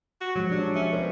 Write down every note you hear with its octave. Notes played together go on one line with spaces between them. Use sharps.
F#4
F3 F#3 G#3 G4
F#3 G#3 D4 D5
C#4 E5
B2 A#4 C5